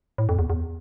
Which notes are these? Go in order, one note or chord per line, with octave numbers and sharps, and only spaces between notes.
A2
F2
E2
E2